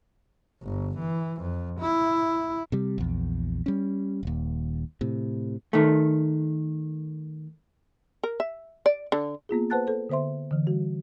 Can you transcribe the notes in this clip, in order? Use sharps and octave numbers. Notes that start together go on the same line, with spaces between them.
G1
E3
F2
E4
C3 G3
A#1 E2
G3 C#4
D#1 D#2
A2 C3
D#3 A3
A#4
E5
D5
D3
A#3 B3 F4 G#4
B4 C5 F#5 A5 F#6 A6
A4 C5
D3 B3 C5 E5 C6
D3 E3
G3 F#4